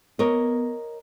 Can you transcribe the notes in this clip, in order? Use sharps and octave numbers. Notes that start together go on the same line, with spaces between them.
B3 A#4 C#5 D#5